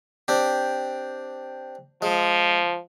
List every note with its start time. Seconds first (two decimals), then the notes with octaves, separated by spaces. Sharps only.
0.28 C4 D4 G4
2.02 F3 G#3